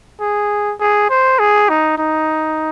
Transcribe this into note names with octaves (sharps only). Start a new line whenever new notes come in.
G#4
G#4
C5
G#4
D#4
D#4